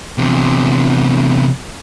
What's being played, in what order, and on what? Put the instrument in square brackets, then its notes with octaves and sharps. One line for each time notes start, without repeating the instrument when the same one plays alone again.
[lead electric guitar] E2 C3